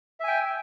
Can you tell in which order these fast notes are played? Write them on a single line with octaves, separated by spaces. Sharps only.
E5 G#5 G5